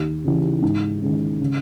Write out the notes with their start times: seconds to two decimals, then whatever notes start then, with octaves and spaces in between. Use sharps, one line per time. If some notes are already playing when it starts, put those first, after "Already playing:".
Already playing: D#2
0.24 C#3 E3
0.62 G#2
1.02 D#3 G#3 C#4
1.40 C#3